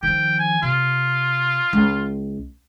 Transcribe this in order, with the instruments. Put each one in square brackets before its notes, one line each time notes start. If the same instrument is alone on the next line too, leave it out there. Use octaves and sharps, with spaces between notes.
[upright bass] D#3 F3 [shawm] G5
[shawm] G#5
[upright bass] C3 [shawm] F4
[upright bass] C#2